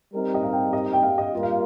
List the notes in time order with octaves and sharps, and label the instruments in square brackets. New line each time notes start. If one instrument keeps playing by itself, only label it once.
[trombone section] G3 C4 D#4 A#4
[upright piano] D#5
F5
G5
D#5
G5
F5
D#5
[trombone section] G3 A#3 F4 A#4
[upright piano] F5